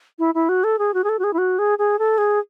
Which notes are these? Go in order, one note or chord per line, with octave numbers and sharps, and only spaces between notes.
E4
E4
F#4
A4
G#4
F#4
G#4
A4
F#4
G#4
E4
F#4
G#4
G#4
A4
G#4